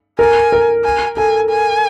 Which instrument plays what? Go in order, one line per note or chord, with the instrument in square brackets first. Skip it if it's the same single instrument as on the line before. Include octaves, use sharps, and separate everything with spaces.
[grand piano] A#4 [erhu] G#5
[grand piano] A#4
[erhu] G#5
[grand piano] A4 [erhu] G#5
[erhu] G#5